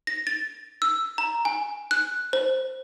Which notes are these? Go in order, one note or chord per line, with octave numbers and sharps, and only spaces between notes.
A#6
A6
E6
A#5
G#5
F#6
C5